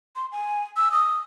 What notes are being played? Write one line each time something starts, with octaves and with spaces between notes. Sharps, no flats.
C6
G#5
E6
D#6